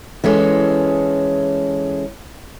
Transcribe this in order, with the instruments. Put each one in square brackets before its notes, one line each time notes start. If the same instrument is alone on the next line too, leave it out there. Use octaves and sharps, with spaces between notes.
[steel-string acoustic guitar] E3 G#3 C#4 A4